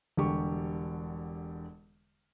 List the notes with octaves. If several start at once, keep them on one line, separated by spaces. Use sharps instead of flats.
E1 D3 G3 G4 C#6